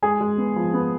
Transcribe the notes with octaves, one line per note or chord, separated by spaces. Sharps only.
G#3 G#4
G#3
B3
F3
B3